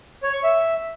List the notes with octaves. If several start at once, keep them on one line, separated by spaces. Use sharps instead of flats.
C#5
C#6
E5